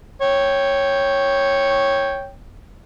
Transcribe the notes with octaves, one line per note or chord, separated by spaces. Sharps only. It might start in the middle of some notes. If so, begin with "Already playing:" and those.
C#5 G5